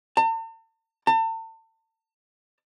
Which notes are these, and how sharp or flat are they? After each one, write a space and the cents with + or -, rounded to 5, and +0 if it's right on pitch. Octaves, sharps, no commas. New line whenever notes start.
A5 +45
A5 +40